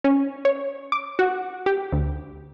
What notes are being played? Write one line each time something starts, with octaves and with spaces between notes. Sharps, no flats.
C#4
C#5
D6
F#4
G4
D2